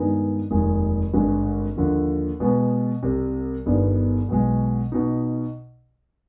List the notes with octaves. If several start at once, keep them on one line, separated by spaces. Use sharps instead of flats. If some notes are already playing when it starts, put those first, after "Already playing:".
Already playing: G2 D#3 G#3 B3 D#4
F1 D#2 D#3 G#3
G#1 G2 D3 G#3
D#2 D3 F3
B2 G#3 B3
C2 C3 G3
G1 G2 D#3 G3 B3
B1 B2 G#3
B2 B3 D#4